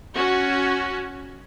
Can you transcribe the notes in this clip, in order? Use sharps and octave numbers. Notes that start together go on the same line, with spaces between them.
C#4 F#4